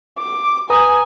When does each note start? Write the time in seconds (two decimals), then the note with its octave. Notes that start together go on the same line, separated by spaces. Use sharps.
0.18 D6
0.70 B4 G#5 A#5 D#6